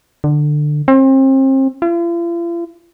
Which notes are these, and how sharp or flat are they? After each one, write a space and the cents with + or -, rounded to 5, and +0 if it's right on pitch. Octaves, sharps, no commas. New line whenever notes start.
D3 +20
C4 +35
F4 -45